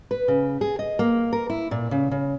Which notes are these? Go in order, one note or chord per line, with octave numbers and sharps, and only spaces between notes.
B4
C#3
G#4
D#5
A#3
A#4
E4
A#2
C#3
C#3